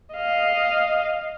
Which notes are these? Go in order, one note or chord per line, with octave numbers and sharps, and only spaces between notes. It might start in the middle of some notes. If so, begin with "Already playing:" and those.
D#5 F5